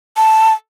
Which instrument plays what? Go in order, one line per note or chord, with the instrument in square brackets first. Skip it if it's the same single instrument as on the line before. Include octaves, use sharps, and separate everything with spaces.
[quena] A5